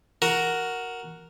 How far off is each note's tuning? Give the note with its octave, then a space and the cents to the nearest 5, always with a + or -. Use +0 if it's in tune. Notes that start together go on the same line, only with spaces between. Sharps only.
F#4 +0 A#4 +0